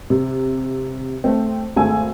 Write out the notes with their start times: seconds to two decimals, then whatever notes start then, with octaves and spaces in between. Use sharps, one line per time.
0.10 C3
1.24 A3 C4
1.76 G#1 A3 G#4 G#5 E6